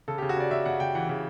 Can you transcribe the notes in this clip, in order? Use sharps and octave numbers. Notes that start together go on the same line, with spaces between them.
C#3 A4
G4
C#3
F#4
C#3 D5
C#3 E5
C#3 F#5
C#3 G5
E3 F#5
C#3